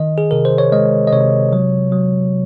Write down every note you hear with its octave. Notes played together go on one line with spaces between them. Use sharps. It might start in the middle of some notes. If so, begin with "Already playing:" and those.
Already playing: D#3 D#5
G#4
C3 A#4
C5
C#5
G#3 D#5
D#5
C3 C#5
F#3
F#3